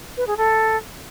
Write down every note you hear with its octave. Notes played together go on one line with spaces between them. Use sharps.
B4
G#4
A4